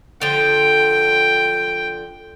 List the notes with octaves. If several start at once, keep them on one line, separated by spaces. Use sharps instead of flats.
D3 F3 G5